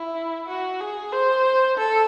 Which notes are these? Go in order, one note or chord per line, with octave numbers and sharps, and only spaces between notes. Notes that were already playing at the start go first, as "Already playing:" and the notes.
Already playing: E4
F#4
G#4
C5
A4